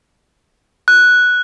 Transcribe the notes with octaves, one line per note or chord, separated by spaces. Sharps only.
F#6